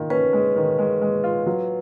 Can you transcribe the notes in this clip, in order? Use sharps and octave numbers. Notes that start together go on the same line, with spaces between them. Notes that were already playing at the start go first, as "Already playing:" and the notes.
Already playing: D#3 F4
C#4 B4
G#3
D#3
G#3
G#3
F4
F#3